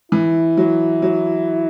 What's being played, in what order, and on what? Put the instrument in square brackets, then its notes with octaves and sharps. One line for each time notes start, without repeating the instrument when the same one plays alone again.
[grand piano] E3 [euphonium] E4
[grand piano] F#3
F#3